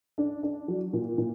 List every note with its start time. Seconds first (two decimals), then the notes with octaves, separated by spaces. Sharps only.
0.18 D4
0.43 D4
0.68 F#3
0.93 A#2
1.18 A#2